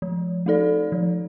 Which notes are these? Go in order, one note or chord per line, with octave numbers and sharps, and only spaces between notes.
F3
A3 D#4 A4 D5
F3